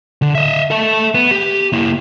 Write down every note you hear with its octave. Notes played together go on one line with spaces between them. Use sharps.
D3
D#5 E5
A4 E5
B3
G4
A#3 E4